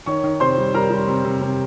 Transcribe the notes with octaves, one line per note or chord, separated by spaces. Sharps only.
D#3 C#5 C#6
D#3
C3 C5 C6
G3
G3 A#4 A#5
G3
C3
C3
C3